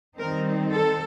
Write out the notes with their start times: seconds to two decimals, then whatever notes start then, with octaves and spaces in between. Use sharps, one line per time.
0.18 D#3 G3 C4 D#4 A#4
0.71 A4